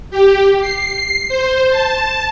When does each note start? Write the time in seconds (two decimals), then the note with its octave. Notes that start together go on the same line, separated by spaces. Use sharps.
0.11 G4
0.60 C7
1.29 C5
1.70 A5